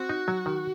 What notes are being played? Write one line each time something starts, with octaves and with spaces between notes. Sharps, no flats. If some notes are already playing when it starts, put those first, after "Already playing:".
Already playing: C4 F#4
D#4
F#3
D#3